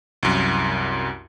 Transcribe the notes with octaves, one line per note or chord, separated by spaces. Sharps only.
C2 F#2